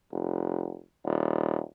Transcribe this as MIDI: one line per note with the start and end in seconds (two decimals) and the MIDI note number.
0.12 0.79 29
1.05 1.59 27